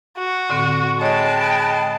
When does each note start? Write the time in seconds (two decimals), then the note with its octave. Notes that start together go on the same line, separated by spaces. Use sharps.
0.18 F#4
0.50 A2 D3 C4
1.01 G#3 C#5 D#5 G5 A5 B5 F#6